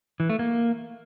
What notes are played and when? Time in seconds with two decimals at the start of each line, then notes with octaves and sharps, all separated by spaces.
0.20 E3
0.30 A3
0.39 A#3